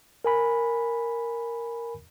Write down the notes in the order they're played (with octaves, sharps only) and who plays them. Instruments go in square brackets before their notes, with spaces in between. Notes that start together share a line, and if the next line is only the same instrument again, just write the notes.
[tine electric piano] A#4 G#5 B5